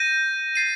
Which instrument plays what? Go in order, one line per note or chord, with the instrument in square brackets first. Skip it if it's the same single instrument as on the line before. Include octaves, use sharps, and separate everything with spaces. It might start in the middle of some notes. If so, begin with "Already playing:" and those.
Already playing: [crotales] G6 A#6 D#7
A6 C7 D#7